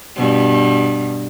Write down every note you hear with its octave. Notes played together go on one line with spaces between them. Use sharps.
G2 B2